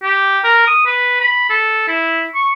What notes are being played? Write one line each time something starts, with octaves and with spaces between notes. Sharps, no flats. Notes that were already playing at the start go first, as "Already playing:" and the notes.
G4
A#4
D#6
B4
B5
A4
E4
C#6